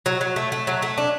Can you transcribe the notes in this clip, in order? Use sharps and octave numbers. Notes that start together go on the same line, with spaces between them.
F#3
F#3
A3
A3
F#3
A3
D4